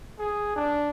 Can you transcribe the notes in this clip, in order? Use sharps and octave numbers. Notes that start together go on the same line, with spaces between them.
G#4
D4